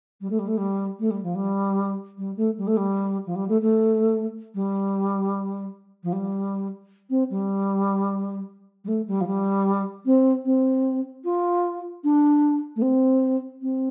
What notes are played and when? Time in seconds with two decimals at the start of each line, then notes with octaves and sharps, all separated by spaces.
0.21 G3
0.30 A3
0.39 G3
0.47 A3
0.57 G3
0.99 A3
1.10 G3
1.22 F3
1.35 G3
2.18 G3
2.36 A3
2.57 G3
2.67 A3
2.77 G3
3.26 F3
3.35 G3
3.49 A3
3.61 A3
4.54 G3
6.03 F3
6.12 G3
7.10 C4
7.30 G3
8.84 G3
8.88 A3
9.07 G3
9.21 F3
9.27 G3
10.05 C4
10.45 C4
11.24 F4
12.04 D4
12.76 A3
12.82 C4
13.62 C4